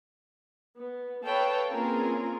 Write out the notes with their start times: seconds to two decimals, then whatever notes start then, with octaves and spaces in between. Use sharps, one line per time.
0.76 B3
1.25 A4 B4 C#5 F5 G5 A5
1.71 A#3 C4 C#4 F4 G#4 A#4